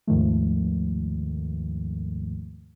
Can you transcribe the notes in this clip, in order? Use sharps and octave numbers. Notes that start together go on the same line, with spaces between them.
D#2 G#2 D#3 F3 A3